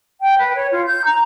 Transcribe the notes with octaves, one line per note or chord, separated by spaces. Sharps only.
G5
B4
C#5
F4
G6
A#5